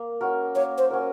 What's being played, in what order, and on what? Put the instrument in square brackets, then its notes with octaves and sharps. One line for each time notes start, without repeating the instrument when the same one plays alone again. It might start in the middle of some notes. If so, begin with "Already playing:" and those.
Already playing: [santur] A#3
C#4 F#4 A#4
[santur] A#3 [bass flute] C#5
[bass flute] C5
[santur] C#4 F#4 A#4